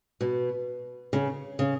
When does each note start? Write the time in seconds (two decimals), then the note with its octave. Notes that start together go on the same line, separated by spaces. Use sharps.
0.21 B2
1.13 C#3
1.59 C#3